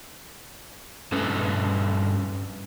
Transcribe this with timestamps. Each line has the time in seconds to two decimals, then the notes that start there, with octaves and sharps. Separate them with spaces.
1.12 G2 C#4 A4 B4